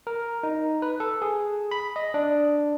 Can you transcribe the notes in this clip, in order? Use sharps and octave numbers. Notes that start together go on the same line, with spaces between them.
A#4
D#4
B4
A4
G#4
B5
D#5
D4